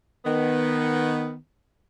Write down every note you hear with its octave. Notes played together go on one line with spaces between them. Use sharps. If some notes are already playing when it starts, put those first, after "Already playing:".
D#3 B3